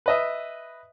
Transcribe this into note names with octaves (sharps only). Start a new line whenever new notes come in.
B4 D#5 E5